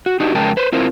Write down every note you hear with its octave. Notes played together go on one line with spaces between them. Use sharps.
F#4
D4 D#4 F#4 G4
F2 C#3 G#3 A#4 G5 A5
B4 C5
C4 E4 F4 A#4 C5